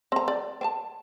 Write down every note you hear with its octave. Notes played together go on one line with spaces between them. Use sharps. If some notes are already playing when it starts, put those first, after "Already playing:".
C4 A#5
D5
C4 A5